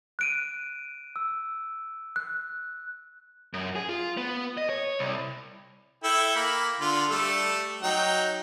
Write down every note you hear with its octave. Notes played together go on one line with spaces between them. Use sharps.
F#6 D7 D#7
E6
F#6
F#2
G#4
F4
B3
D#5
C#5
C2
E4 A4 G5
A#3 B5
D3 F4
G3 A3 A4
F#3 D#4 G5